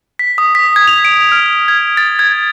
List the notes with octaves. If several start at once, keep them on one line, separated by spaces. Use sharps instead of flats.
B6
D#6
B6
G#6
F7
D7
F6
G#6
A6
G#6